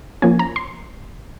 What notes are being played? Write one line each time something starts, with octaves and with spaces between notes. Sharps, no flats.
F3 A#3 C#4 G#5
A#5
C6